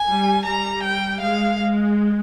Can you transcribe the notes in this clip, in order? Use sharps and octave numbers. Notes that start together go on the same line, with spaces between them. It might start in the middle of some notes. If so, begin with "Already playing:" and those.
Already playing: G#5
G3
G3 A#5
G5
G#3 F5
G#3